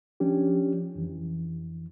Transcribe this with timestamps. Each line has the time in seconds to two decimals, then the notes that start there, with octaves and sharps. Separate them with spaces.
0.20 F3 C#4 D4 G4
0.95 F2 E3